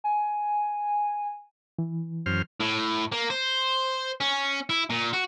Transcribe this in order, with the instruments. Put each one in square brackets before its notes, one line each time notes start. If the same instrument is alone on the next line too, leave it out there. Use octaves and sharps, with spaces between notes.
[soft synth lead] G#5
[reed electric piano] E3
[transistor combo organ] F#2 C5 F6
[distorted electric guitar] A2
A#3
C5
C#4
E4
A#2
F#4